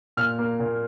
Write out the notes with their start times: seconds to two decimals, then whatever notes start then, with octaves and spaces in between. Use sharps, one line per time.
0.17 A#2 F6
0.39 A#3
0.60 A#2